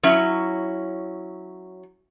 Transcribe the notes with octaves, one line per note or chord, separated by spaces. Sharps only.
F#3 C#4 E4